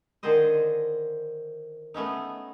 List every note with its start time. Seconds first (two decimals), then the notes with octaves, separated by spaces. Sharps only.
0.23 D3 D#3 G#4 C5 D#5
1.94 A3 B3 C#4 D#4